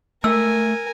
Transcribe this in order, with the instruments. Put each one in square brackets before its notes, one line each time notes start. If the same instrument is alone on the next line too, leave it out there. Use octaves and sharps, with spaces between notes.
[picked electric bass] A3 [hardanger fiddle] A#4 G#5 [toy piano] E6